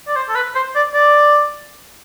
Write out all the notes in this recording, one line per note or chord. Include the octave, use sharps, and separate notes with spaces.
D5
C5
A4
B4
C5
D5
D5